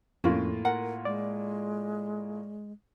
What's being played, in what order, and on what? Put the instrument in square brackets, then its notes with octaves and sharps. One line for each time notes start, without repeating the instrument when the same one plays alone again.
[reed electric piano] F2 [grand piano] A2 A#3 F4 [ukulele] C#4
[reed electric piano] A#4 [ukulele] F#5
[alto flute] G#3 [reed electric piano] D5